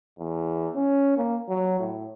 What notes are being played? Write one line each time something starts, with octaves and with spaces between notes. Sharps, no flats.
E2
C#4
A#3
F#3
A2